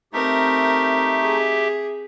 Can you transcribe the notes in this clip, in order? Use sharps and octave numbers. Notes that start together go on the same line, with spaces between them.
A3 C4 D#4 G4 A#4 E5
G#4